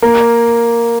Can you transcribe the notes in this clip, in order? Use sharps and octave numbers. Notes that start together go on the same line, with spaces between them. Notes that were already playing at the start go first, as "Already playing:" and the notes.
A#3